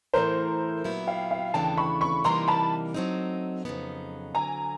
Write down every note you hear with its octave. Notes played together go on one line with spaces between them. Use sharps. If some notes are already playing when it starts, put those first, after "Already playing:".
A2 E3 A3 A#4 C5
A#2 F#3 B3 E4
F5 G5
F5 G5
D#2 C#3 E3 A3 D4 G5 A5
B5 C#6
B5 C#6
C3 E3 G3 A#3 D#4 A#5 C6
A5 B5
F#3 A3 C4 D#4
F2 C#3 F#3 B3 D#4
D2 D3 F#3 G#5 A#5